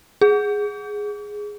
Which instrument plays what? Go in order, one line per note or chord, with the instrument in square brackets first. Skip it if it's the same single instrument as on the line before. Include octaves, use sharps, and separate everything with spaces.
[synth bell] G#4